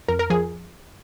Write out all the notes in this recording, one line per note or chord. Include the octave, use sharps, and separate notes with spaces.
F2 A#4
A#4
F3 G#4